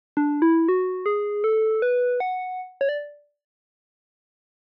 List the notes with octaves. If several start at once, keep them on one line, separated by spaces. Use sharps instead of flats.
D4
E4
F#4
G#4
A4
B4
F#5
C#5
D5